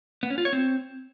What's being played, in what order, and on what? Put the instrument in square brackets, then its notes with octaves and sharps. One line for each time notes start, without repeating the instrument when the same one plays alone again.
[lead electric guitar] B3
C#4
F4
C#5
C4